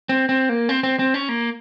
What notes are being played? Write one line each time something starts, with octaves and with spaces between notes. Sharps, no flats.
C4
C4
A#3
C4
C4
C4
C#4
A#3